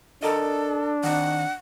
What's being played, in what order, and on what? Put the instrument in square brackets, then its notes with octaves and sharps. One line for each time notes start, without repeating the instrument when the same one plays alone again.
[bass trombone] D4 [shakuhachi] A4 [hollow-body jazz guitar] A#4 D5 D#5
[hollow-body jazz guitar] D#3 C4 [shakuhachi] F#5